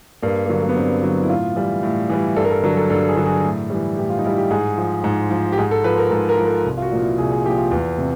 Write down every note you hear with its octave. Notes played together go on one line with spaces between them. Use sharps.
G2 A#3
D3 F#3 A#3
A#3
B3
G2 C4
D3 F#3
E4
A2 F4
E3 G3
A2
E3 G3
G2 A4
A#4
A4
D3 F#3 A#4
A4
G2 A4
G#4
D3 F#3
G#4
A2
E3 G3
A2 G4
F4
D#4
E3 G3 E4
G4
G#2 G#4
F3
G#2
F3
G4
G#2 G#4
A4
F3 B4
A#4
G#2 A4
A#4
F3
A4
C2
F4
F#4
A#2 F3
E4
C2 G#4
G#4
A#2 F3 G4
F4
E2
C3